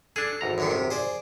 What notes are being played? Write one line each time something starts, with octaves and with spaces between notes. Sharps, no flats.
D4 G#4 A4
G#1 E2 A#5
F#2 D3 D#3
C3
G#4 C5 D5